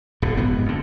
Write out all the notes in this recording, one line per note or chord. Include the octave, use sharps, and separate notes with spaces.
D#1 A2
F1 G#2 B3
F2 D3